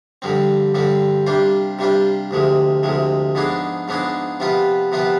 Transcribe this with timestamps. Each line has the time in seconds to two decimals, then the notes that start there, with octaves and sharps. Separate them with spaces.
0.22 G2 D3 F3 C4
0.74 G2 D3 F3 C4
1.27 C3 G3 D4 F4 C5
1.79 C3 G3 D4 F4 C5
2.31 D2 C3 F3 G#3
2.83 D2 C3 F3 G#3
3.35 G#2 F3 B3 D4 G#4
3.88 G#2 F3 B3 D4 G#4
4.40 C3 F3 B3 F4 B4
4.92 C3 F3 B3 F4 B4